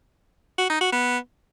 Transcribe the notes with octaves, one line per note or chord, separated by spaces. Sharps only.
F#4
D#4
F#4
B3